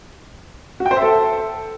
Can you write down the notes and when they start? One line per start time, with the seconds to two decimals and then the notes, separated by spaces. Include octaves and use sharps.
0.80 F#4
0.86 G5
0.91 C5
0.96 E5
1.02 A4